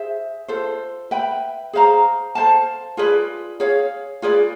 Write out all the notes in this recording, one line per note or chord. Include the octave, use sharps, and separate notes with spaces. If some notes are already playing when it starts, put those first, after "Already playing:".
Already playing: G#4 C5 E5
F4 A4 C5
B4 E5 G5 B5
G#4 C5 F5 A#5
A4 C5 F5 A5
F4 G#4 B4 D5
G#4 C#5 F5
F4 G#4 B4 D5